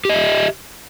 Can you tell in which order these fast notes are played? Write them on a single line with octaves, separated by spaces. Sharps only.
G4 D#5 E5